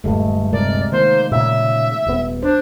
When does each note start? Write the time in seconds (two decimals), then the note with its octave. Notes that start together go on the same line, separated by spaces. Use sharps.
0.04 D#1 G2 D3 G#3 A3
0.53 C3 G#3 A#4 D5
0.92 D#3 A#3 C5
1.31 A#2 C#3 E5
2.06 D#1 B3
2.43 D4 C5